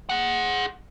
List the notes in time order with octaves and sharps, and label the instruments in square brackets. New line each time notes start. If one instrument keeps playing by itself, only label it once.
[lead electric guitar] G#4 F#5